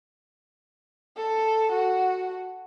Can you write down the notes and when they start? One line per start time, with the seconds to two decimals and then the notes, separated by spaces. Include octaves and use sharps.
1.17 A4
1.72 F#4